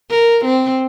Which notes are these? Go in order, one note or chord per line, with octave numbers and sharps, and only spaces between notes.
A#4
C4